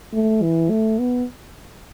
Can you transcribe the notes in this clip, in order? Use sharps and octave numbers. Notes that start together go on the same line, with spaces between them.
A3
E3
A3
B3